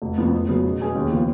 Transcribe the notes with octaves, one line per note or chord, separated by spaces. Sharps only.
F1
F2 F3 B3
F2
C#3 F#3 B3
B2
G#3 C#4 G#4 B4
D#2
C#3 F3 B3 F4